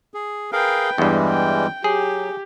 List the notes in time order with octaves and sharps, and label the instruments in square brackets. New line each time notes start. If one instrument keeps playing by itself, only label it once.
[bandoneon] G#4
[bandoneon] G#4 A#4 F5 [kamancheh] B4 G5
[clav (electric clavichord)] E2 G2 [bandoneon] E3 G3 G#3
[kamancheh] G5
[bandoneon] F#3 [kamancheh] G4 [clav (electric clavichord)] G#4